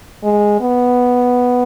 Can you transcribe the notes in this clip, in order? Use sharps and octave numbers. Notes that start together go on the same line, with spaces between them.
G#3
B3